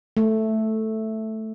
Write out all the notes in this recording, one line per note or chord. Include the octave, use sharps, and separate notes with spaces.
A3